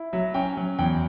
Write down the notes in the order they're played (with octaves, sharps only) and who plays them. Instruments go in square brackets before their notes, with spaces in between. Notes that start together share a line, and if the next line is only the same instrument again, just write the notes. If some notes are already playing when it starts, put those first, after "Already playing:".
Already playing: [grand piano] E4
F#3 E5
C#4 G5
F#3
E2 G5